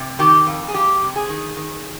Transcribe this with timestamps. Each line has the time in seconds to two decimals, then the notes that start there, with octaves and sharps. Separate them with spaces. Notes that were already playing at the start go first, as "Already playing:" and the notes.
Already playing: C3
0.19 D#3 G4
0.47 F2
0.68 G#4
0.74 F2 G4
1.02 C3
1.16 G#4
1.29 D#3
1.56 D#3